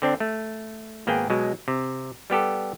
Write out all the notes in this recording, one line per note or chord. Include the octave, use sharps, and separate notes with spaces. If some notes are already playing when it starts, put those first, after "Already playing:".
D3 C4 D4
A3
G#1 A#3 B3 G#4 G5
B2 F#3 G#3
C3
G3 B3 G4 A4